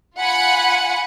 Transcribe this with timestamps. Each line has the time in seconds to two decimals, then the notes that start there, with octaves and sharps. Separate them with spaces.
0.18 F4 F#5 G#5 B5 F#6 C#7